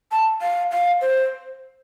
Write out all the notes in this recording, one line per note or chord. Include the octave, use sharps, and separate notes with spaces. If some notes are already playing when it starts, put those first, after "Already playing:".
A5
F5
F5
C5